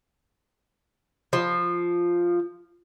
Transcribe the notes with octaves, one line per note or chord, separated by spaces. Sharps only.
F3